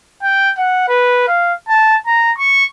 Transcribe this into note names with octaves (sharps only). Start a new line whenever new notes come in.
G5
F#5
B4
F5
A5
A#5
C#6